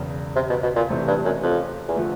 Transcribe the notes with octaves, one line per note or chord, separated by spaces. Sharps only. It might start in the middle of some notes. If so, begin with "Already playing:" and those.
Already playing: E1 E2 C#3
C3
B2
B2
A#2
C3 E3 A3 C4
G2
F#2
F2
E2
D3 F3 A3